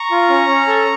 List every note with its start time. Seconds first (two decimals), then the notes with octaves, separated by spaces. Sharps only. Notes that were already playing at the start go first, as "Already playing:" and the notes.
Already playing: A#5 C#6
0.11 F4
0.30 C#4
0.48 C#4
0.67 A4